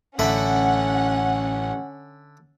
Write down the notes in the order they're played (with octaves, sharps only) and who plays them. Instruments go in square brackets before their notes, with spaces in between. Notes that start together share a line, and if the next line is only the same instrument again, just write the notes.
[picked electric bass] A1 [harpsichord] D3 E5 B5 [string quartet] C#4 [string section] F#5